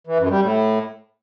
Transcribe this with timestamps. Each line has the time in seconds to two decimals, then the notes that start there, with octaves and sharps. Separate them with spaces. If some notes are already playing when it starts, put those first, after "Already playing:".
0.07 E3
0.19 F#2
0.30 G3
0.42 A2